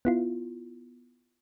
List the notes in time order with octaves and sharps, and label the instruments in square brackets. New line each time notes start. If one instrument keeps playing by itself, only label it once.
[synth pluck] B3 E4 F4